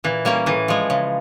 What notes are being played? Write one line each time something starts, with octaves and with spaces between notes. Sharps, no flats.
A#2 E3
G3 A#3 C#4
A2 E3
F3 G#3
C#3